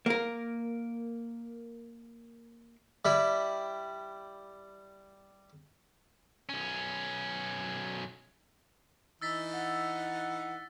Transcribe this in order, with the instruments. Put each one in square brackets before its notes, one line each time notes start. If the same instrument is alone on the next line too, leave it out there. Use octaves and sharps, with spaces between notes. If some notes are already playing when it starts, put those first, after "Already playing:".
[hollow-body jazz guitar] A#3 A#4
[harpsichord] G3 E4
[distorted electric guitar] B1 C#4
[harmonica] E3 D#4 [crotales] E6 A6 B6
[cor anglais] F#5